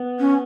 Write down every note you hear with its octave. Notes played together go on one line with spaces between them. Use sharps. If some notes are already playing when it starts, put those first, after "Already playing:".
Already playing: B3
C#4